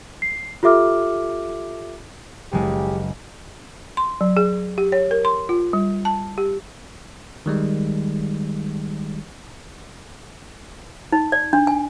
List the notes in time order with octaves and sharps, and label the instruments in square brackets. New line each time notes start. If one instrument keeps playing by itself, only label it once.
[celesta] C7
F4 G4 A4 E5 D6 F6
[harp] F#1 G#3 [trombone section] C#3 G4
[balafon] C6
F#3
G#4
G4
C#5
A#4
C6
F4
G3
A5
G4
[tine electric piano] D#3 G3 G#3
[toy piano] D#4
D5
D4
G#5